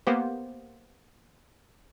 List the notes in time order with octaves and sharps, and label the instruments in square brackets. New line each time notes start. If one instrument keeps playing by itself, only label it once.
[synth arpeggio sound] A#3 B3 G4 C5